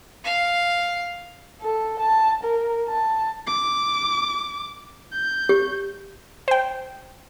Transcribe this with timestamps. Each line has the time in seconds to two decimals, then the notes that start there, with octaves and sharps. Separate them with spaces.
0.24 F5
1.61 A4
1.99 A5
2.43 A#4
2.88 A5
3.47 D6
5.13 G6
5.49 G4
6.48 C5 G5